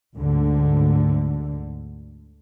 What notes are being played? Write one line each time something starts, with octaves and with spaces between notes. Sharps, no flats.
D2 G#2 D3